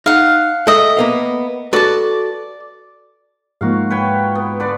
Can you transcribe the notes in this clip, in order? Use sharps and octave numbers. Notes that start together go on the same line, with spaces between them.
D#4 F5 F#5
A4 D#5 E5 G5
A#3 B3 F5
F#4 A4 B4 D5 A5
G#2 F3 A#3 F#4 F5
B4 C#5 G5
B3
D3 B4 D5